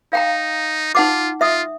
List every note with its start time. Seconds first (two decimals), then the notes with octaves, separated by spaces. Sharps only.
0.13 D#4 F5 G5 A#5
0.95 D#4 F4 F#5 D6
1.41 F4 E5 D#6